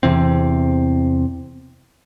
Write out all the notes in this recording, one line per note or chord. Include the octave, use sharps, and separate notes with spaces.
E2 C3 E3 C4